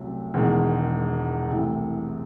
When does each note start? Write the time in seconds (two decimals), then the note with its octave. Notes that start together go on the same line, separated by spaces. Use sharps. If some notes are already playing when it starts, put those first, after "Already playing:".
Already playing: C2 C3 F#3 A3 C#4
0.34 E1 E2 D#3 G#3
1.49 C2 C3 E3 A3